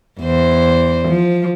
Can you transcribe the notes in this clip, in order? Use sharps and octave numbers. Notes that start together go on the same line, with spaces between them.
E2 C5
F3